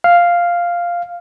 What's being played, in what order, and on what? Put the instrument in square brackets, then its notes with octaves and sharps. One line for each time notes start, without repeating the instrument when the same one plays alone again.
[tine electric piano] F5